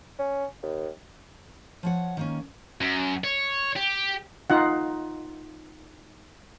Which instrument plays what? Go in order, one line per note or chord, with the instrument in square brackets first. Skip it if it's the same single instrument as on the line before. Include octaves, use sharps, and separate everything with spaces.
[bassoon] C#4
D#2
[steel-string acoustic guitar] F3 C#5 F#5
D#3 A#3 C#4
[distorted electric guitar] F#2
C#5
G4
[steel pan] D#4 F4 F#5